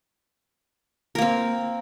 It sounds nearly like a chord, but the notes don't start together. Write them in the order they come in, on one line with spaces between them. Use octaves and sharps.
A#4 A#3 C4